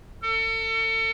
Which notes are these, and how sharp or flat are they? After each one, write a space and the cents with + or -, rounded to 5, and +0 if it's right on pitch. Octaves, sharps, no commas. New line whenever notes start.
A4 +35